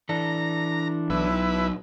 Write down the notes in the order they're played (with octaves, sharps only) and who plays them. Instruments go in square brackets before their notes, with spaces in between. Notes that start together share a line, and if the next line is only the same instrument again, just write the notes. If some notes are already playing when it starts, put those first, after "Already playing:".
[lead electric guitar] E3 A4 [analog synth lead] D4 [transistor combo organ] A#5
[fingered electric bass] B1 [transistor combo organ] E4 B4